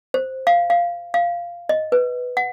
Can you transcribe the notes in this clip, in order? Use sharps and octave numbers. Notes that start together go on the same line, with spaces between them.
C5
F5
F5
F5
D#5
B4
F#5